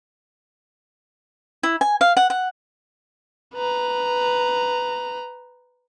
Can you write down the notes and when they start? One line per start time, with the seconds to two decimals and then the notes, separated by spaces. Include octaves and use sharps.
1.63 E4
1.81 G#5
2.01 F5
2.17 F#5
2.30 F#5
3.55 B4 A#5